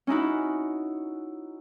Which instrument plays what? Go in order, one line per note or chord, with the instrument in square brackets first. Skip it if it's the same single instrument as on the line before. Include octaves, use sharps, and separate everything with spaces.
[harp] C#4 D#4 E4 F#4